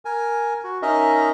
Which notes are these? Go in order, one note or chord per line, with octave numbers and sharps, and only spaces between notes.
A#4 G#5
F#4
C#4 D#4 A#4 D#5 E5